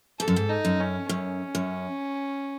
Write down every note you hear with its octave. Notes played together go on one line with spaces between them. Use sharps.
G#2 A4
F#2
G#2
D#4
F#2
C#4
F#2 C#4
F#2